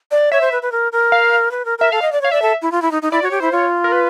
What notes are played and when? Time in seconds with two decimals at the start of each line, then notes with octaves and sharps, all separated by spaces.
0.11 D5
0.32 C#5 E5
0.41 C5
0.52 B4
0.62 B4
0.72 A#4
0.92 A#4
1.12 F5
1.51 B4
1.65 A#4
1.78 A#4 E5
1.92 A4 F5
2.02 D#5
2.12 D5
2.21 C#5 F5
2.32 D5 E5
2.42 A4
2.62 E4
2.72 F4
2.82 E4
2.91 D#4
3.02 D#4
3.11 E4 D5
3.22 F#4 C#5
3.31 G4
3.40 E4 C5
3.52 F4 C#5
3.84 A#4
3.92 B4